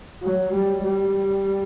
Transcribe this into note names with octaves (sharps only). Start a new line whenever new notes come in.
F#3
G3
G3